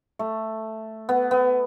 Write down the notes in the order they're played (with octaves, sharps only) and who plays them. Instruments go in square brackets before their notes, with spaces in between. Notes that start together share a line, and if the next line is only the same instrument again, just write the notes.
[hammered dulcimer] A3
B3
B3